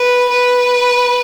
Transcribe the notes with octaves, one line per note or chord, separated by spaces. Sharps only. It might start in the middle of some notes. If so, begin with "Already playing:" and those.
Already playing: B4
B4